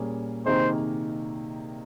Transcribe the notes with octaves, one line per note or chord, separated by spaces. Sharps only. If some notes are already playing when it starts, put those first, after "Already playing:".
Already playing: A#2 G3 A#3 C#4 G#4
C3 D#3 A#3 D#4 G#4 C5